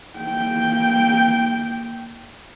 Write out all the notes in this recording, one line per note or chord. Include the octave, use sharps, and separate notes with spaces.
A#3 G5